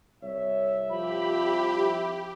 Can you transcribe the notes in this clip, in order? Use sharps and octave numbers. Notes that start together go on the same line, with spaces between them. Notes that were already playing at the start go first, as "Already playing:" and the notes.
C2 C#5 E5
F3 G4 B5